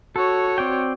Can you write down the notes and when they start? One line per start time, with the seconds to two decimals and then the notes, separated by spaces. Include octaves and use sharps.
0.16 F#4 A4 C#5
0.58 C4 D5 G5